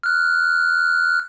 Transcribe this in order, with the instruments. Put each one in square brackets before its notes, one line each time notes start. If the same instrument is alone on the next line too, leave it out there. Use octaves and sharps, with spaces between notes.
[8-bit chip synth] F6 F#6